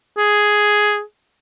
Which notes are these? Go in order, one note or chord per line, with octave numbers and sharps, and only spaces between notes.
G#4